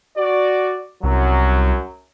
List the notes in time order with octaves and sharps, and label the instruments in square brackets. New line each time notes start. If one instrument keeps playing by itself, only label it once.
[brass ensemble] F#4 D5
[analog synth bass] C2 [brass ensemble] F#2 F#3